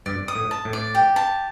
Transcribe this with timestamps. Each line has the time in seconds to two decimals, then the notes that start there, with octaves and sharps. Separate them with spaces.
0.06 G2 D5
0.28 D#6
0.35 A2
0.51 A5
0.65 A2
0.73 D5
0.95 G4
1.16 A5